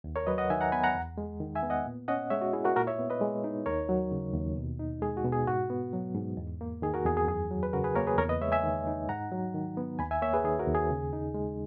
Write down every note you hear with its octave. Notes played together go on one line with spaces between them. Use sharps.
D#2
A#4 C#5
F#3 B4 D#5
D#5 F#5
D#3 E5 G#5
F#5 A#5
B3 G#5 B5
F#5 A#5
E2
G#3
D#3
E5 G#5
B3
D#5 F#5
A#2
C#4 D#5 F#5
G#3 C#5 E5
F#4
E4 G#4
F#4 A#4
A#2 F#4 A#4
C#5 E5
B3
B4 D#5
G#3
D#4
D#2 A#4 C#5
F#3
C#3
D#2
B2
D#4
G#3 G#4
F#4
B2
G#4
G#2 F#4
B3
F#3
G#2
E2
A#3
D#3 G#4
F#4 A#4
E2 G#4
G#4
F#2 G#4
F#3
B4
C#3 F#4 A#4
G#4 B4
A#3 A#4 C#5
G#4 B4
E2 A#4 C#5
B4 D#5
G#3 C#5 E5
E5 G#5
D#3
D#4
G#2 F#5 A#5
F#3
D#3
B3
D#2 G#5 B5
E5 G#5
A#3 C#5 E5
G#4 B4
D#3 G#4
F#4 A#4
D#2
G#4
C#3
D#4
G#3